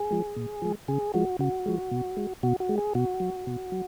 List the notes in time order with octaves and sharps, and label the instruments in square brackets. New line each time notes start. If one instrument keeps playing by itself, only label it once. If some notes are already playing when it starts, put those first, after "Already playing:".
Already playing: [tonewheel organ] G#4
F3 G#3
A#2
F3 G#3
C#3 G#4
F3 G#3 F#4
C#3 F#4
F3 G#3
B2
G#3
B2 F#4
F#4
G#3
G#4
B2 F#4
F#3
B2
F#3